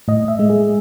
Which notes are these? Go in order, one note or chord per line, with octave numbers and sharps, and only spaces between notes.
A2 D#5
E5
G#3
G#4